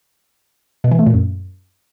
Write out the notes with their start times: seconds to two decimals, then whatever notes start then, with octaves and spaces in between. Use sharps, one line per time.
0.84 B2
0.92 E3
0.99 A3
1.06 A#2
1.14 F#2